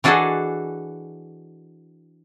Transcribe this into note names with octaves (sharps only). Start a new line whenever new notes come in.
E3 D4 F#4 G#4 A4 D#5